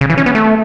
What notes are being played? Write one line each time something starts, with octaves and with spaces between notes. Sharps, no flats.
C#3
E3
C#4
B3
A3